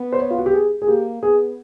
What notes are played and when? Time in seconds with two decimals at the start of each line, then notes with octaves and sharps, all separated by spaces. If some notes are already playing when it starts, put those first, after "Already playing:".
Already playing: B3
0.13 C5
0.19 C#5
0.30 F4
0.38 F#4
0.46 G4
0.53 G#4
0.82 G#4
0.87 A#3 G4
1.23 B3 G#4